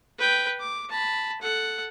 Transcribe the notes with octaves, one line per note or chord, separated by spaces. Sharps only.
B4 G5
D6
A5 B5
A4 F#5